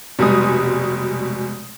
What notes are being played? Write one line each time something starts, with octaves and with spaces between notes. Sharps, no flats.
F1 B2 G3 G#3 D#6